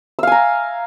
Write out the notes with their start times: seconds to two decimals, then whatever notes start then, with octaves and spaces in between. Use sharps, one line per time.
0.19 E6
0.23 F5
0.27 G#5
0.32 A#5